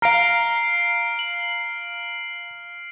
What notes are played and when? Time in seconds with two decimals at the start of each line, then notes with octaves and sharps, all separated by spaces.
0.02 F5 A#5 F6 C7 D7
1.19 F#7